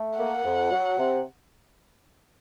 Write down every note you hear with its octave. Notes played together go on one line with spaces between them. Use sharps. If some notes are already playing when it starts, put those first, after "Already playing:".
Already playing: A3
A#3 F#5
F2
F#3
C3